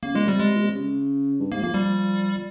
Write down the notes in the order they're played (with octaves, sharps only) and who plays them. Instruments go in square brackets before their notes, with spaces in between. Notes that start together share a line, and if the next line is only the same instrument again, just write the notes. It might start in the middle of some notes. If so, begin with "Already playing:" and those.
[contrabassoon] C#3 [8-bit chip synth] A#3
[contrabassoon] A#2 [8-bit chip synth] G#3
[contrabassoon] C3 [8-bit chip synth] G3
[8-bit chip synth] G#3
[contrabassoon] A#2
C3
C#3
G2
[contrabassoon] G#2 [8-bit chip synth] A#3
[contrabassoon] F3 [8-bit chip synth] A#3
[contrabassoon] F3 [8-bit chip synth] G3